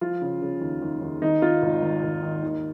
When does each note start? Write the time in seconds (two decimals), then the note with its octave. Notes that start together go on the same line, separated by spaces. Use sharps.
0.01 F3 F4
0.22 C#3
0.42 C#3
0.61 D#2
0.82 D#2
1.02 D#2
1.22 D#3 D#4
1.41 D#3 F4
1.62 G#1
1.82 D#3
2.03 G#1
2.23 D#3
2.43 D#2